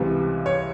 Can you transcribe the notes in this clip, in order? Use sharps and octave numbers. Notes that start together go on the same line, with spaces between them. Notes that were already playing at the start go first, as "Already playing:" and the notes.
Already playing: C#2 C3 E3 G3
C#5